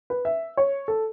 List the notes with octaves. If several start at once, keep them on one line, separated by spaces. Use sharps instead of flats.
B4
E5
C#5
A4